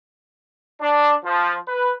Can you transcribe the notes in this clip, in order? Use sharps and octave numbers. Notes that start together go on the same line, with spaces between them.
D4
F3
B4